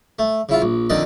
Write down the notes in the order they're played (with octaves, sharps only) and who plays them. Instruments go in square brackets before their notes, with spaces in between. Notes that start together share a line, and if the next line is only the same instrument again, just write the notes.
[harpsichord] A3
C#3 E4 F4
A#1
F2 D3 D#3 D5 D#5